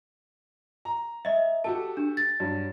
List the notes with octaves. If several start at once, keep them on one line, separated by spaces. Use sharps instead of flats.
A#5
D#5 E5
F#4 G4 A4 A5
D4
A6
G2 F#3